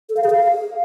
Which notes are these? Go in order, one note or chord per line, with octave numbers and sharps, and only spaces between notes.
A4
F5
G#4
F5